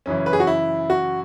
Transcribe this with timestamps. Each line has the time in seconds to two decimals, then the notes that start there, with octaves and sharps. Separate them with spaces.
0.06 F#2 C#3 E3 C#4
0.26 B4
0.33 G#4
0.40 F#4
0.47 E4
0.90 F#4